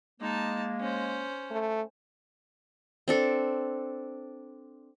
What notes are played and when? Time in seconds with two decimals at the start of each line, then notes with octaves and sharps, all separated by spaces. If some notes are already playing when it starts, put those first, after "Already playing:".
0.21 G#3 A#3 D#4 A5
0.80 C#4 C5
1.51 A3
3.08 C4 D4 A4